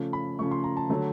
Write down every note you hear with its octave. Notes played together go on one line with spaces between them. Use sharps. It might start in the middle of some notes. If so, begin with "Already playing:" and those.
Already playing: C#3 F3 A3
B5
C#3 F3 A3 C#6
C6
A#5
A5
D3 F#3 A3